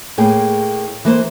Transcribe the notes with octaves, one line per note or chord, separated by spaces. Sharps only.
A2 A#3 G#4 G5
E3 A#3 C5